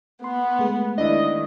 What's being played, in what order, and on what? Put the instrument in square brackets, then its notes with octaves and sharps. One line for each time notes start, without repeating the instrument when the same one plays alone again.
[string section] B3 [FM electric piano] C6
[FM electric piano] G#3 A3 G#4
[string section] D#3 [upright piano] D4 E4 [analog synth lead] D#5